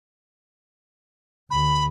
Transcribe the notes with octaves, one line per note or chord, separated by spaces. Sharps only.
D2 B5